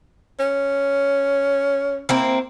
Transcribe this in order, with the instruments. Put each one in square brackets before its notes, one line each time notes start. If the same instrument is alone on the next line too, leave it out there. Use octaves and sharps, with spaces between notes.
[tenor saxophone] C#4
[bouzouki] A#3 C4 E4